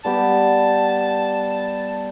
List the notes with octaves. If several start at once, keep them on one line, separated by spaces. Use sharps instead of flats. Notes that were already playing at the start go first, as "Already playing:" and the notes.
G3 B3 G4 A5